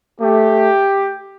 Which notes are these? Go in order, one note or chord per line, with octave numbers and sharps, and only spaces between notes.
A3 G4